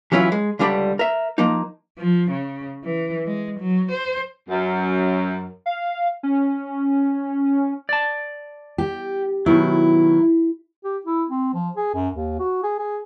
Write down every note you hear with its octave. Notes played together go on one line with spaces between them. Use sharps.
E3 F#3 C#4 E4 F4
G#3
C#2 D3 G3 D4 G5 B5
A#4 E5
F3 A#3 D#4
F3
C#3
E3
G#3
F#3
C5
F#2
F5
C#4
D5 A5
G4
B2 D#3 F#3 E4
G4
E4
C4
F3
G#4
F#2
D#2
F#4
G#4
G#4